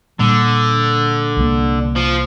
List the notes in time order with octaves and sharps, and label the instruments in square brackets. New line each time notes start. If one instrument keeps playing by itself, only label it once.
[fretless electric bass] A#2 G3 A#3 [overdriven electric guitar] D3
[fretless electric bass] C2 C3 G3 A#3
[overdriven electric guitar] F3